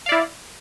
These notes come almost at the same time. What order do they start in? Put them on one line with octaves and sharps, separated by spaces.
F5 D5 E4